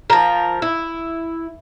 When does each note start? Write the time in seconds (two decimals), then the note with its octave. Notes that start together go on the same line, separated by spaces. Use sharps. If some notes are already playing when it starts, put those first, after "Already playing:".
0.10 F3 A#4
0.62 E4